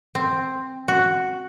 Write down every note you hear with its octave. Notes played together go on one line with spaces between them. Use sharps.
C4
F#4